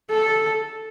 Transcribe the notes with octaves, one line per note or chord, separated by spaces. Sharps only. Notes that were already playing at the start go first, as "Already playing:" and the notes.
A4